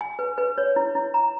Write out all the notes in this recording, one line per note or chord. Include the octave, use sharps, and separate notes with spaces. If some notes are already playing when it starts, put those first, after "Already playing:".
G#5
B4
B4
C#5
E4
E4
A#5